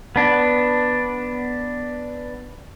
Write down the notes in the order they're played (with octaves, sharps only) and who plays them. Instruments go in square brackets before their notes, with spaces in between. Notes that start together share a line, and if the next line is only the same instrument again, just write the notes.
[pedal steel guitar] B3 D4